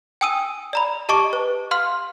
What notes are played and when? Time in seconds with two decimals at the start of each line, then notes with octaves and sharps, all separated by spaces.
0.21 G5 G#5 D#6 E6 D#7
0.73 D5 A#5 B5
1.09 G4 D#5 A5 C#6 D6 D7
1.33 B4
1.71 F5 C6 F6